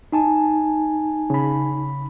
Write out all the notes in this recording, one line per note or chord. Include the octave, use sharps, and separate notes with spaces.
D#4 G#5 A5
C#3 B5